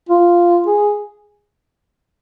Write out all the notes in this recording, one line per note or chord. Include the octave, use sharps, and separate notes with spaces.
F4
G#4